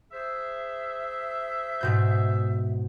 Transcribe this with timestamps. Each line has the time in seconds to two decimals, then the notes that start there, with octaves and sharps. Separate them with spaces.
0.12 G#4 C5 E5
1.81 G#2 B2 G6